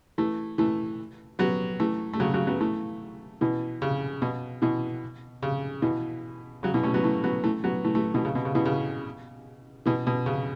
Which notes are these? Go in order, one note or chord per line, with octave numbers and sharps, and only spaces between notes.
E3 A3
E3 A3
F#3 B3
E3 A3
A3
C#3 F#3
C#3 F#3
F#3 B3
E3 A3
B2 E3
C#3
B2
B2 E3
C#3
B2 E3
C#3 F#3
B2 E3
A3 C#4
F#3 B3
E3 A3
F#3 B3
E3 A3
F#3 B3
E3 A3
E3 A3
B2 E3
C#3
B2
C#3
B2 E3
C#3
B2 E3
B2
C#3